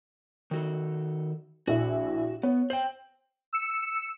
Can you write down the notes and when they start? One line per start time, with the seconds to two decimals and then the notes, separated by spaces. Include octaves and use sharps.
0.51 D#3 F#4 A4
1.67 A#1 E4 F#4
2.43 B3 C#5
2.70 C5 G5 F#7
3.53 E6 C#7